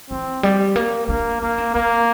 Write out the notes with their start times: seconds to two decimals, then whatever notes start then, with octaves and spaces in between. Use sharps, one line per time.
0.10 E3 C4
0.43 G3
0.76 A#3
1.08 A#3 D4
1.42 A#3 D4
1.58 C4
1.74 A#3 C4